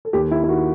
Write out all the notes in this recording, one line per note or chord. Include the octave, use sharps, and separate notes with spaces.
A4
D#2 G4
E4
E4
D#3 F#4